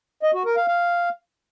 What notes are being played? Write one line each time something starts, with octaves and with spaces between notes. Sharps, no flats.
D#5
F#4
A#4
F5
F5